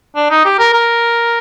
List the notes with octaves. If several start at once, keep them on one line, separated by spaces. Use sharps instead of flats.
D4
D#4
G4
A#4
A#4